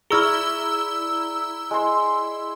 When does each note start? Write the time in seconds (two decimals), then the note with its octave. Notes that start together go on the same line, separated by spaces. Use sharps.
0.10 E4 G#4 D5 A#5 C#6 E6 F6 G7
1.71 G#3 C6